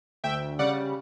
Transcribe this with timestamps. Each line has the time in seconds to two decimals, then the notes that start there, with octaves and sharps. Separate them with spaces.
0.24 D2 E5 G5
0.59 C#3 G3 D5 F#5